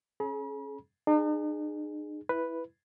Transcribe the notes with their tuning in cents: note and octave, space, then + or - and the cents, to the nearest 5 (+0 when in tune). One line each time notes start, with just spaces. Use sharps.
C#4 -20 G#4 +40 B5 -45
D#4 -45 G#4 +0
E4 +0 B4 +0